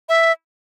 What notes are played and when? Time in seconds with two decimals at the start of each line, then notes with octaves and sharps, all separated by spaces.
0.09 E5